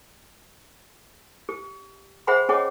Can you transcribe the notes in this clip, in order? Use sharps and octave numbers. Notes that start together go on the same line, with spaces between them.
G4
G#4 C5 E5 F#5 B5 C6
C#4 G#4 C#5 D#5 F#5 D6